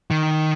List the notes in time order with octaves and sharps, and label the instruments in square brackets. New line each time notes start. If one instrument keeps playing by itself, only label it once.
[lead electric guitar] D#3